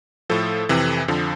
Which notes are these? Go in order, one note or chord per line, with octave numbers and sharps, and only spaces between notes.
A2 F3 A4
F2 C3 E3
F2 D3 F3